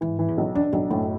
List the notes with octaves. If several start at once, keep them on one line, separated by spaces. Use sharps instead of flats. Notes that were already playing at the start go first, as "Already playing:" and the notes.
G#2 E3
E3
E2
B1
E2 D4
B1 F#2
F#2 A2